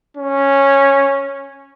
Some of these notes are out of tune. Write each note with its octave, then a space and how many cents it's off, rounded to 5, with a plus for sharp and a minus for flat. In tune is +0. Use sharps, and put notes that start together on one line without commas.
C#4 -5